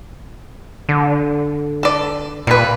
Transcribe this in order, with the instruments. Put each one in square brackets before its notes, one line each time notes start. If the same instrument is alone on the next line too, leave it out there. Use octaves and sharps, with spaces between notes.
[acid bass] D3
[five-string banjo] A4 D5
[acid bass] A#2 [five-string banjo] G3 B4